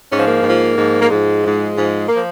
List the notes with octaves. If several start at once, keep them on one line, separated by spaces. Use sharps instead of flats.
G#2 F3 C#4
A#3
G#2 F3
G#2 F3
A#3
G#2 F3 G#3
G#2 F3
G#2 F3
F3 A#3